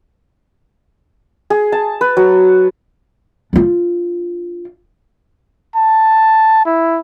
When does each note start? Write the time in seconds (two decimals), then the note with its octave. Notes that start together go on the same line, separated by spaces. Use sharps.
1.50 G#4
1.72 A5
2.01 B4
2.17 F#3
3.53 D4 F4
5.76 A5
6.65 E4